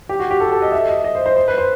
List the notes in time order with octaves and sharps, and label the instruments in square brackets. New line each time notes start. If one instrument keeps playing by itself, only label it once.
[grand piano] G4
F#4
G4
A4
A4
D#5
E5
D#5
D#5
C5
C5
C5
B4
C5